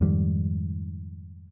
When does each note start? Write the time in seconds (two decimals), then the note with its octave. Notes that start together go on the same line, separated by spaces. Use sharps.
0.01 F2 G#2 D#3 G3